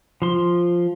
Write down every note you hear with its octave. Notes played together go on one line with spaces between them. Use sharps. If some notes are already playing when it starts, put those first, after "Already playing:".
F3 C6